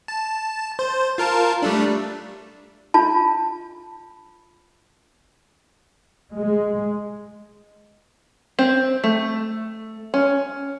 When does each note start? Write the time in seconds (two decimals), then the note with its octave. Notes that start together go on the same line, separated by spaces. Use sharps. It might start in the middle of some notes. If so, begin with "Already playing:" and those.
0.08 A5
0.79 C5
1.18 F4 A#4 A5
1.62 G3 A3 D4
2.94 D4 F4 A5
6.37 G#3
8.59 C4
9.04 A3
10.14 C#4